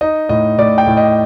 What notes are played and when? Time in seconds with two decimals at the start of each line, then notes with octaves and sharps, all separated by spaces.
0.01 D#4 D#5
0.29 A2 D#5
0.58 A2 D5
0.78 G5
0.87 A2
0.97 D#5